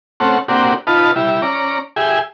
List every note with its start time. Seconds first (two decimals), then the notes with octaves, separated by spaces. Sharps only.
0.20 A3 C4 C#4 F#5
0.48 A#3 C4 D4 F#4 G4
0.87 D#4 F4 B4 A5
1.16 G3 E4
1.42 C#4 D5 A#5
1.96 G4 G#4 E5 G#5